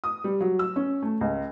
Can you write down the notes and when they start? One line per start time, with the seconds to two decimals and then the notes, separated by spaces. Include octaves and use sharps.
0.04 D#6
0.24 G3
0.41 F#3
0.59 E6
0.76 C#4
1.02 A3
1.21 C#2